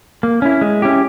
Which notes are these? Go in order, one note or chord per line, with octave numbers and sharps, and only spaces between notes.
A#3
C#4 E4
G#3
C#4 E4 G4